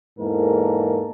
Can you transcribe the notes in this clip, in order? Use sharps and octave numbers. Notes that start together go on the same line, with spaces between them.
E2 G#2 E3 A#3 A4 A#4